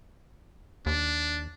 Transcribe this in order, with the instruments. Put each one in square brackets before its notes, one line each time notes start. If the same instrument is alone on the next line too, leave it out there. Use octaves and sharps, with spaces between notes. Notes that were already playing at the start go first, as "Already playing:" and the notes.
[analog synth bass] D#2 [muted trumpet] D4